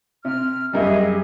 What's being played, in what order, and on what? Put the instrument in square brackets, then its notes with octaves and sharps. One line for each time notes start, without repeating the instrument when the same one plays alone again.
[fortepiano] C3 [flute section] F6
[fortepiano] F#2 C#3 G3 [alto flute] G4 [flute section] G#4 D#5 E5